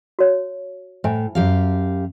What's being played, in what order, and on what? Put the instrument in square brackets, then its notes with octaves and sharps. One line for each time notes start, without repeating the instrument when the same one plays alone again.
[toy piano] F#4 C#5
[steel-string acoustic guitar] A2 [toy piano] C5 E5 G#5
[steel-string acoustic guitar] F#2 G4 F5